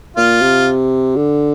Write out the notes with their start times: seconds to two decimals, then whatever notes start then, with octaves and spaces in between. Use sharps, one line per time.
0.17 A#2 F4
0.42 C3
1.16 D3